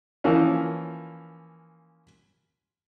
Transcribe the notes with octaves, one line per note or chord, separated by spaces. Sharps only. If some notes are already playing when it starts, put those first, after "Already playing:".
E3 F3 A#3 C#4